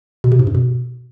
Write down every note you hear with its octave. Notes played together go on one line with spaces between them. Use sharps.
B2
C3
G#2
F#2
B2